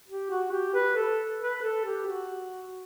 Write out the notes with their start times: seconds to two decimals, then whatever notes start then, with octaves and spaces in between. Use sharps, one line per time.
0.08 G4
0.31 F#4
0.52 G4
0.75 B4
0.96 A4
1.41 B4
1.63 A4
1.85 G4
2.07 F#4